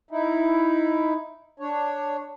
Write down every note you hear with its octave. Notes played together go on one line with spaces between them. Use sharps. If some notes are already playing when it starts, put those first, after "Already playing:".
D#4 E4
D4 C#5